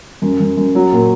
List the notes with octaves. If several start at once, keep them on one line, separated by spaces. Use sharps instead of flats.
F#2
F#2
F#2
F#3
A#2